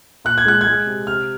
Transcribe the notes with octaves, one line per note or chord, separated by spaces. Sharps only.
A#2 F#6
G#6
G#3 F#6
G#6
G#3
F#6
C3
C3 F6